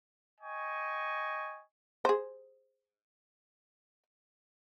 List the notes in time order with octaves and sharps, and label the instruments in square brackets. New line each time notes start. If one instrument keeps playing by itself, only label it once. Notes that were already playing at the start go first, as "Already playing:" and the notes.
[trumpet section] D#5 G5 G#5 C#6
[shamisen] G#4 C5